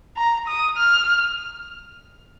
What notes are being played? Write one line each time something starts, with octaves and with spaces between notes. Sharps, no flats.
A#5
D#6
F6